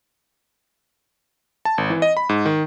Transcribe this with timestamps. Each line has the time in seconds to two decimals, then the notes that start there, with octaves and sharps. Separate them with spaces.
1.65 A5
1.78 G#1
1.90 E3
2.02 D#5
2.17 B5
2.29 G#2
2.46 D#3